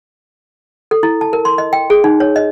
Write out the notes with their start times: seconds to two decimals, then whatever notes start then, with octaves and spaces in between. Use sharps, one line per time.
0.91 A4
1.03 E4
1.21 A5
1.33 A#4
1.45 C6
1.58 D#5
1.73 G5
1.90 G#4
2.04 D#4
2.20 C#5
2.36 D#5